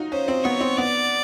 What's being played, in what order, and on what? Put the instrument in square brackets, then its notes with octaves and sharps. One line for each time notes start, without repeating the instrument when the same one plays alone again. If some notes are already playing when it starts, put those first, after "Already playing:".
Already playing: [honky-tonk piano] D#4 F4 F#4
[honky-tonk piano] C#4 [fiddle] C5
[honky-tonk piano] C4
[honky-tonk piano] B3 [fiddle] C#5
[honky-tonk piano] C4
[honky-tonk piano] B3 [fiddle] D5